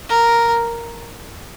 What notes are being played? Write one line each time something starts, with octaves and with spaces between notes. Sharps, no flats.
A#4